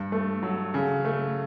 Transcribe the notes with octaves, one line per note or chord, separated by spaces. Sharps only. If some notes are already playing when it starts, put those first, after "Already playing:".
Already playing: G2
A3
F#3
C#3
A3